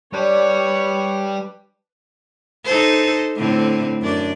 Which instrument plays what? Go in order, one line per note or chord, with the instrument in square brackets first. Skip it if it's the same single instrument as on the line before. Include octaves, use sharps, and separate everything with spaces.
[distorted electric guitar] G3 [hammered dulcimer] D4 B4 D5 [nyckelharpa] C#5
[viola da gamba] D#4 A4 C5
A2 D3 C4
F#2 D4 D5